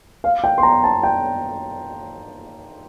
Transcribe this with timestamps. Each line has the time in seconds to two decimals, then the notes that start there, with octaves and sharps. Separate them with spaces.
0.24 F5
0.44 G5
0.58 C6
0.63 A#5
0.84 A5
1.03 G5